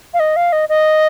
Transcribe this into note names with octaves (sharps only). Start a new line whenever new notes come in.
F5
D#5
F5
D#5
D#5